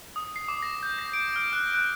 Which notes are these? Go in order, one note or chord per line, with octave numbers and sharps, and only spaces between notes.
D#6
C7
D6
A#6
G6
A#6
D7
F6
F#6
F#6